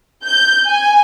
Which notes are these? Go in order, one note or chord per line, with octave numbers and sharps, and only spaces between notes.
G6
G#5